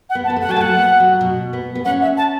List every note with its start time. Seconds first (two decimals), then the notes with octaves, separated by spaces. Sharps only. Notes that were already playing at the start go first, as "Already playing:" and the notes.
0.10 F#5
0.15 B3
0.25 A5
0.30 B3
0.36 A3 F#5
0.49 F#3 A5
0.57 A3 F#5
0.79 B3
1.00 F#3
1.21 B2
1.53 B3
1.75 B3
1.85 C#4 F#5
2.02 E5
2.17 A5